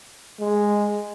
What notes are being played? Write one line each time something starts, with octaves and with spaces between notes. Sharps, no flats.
G#3